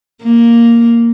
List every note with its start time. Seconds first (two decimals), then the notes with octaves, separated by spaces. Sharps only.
0.22 A#3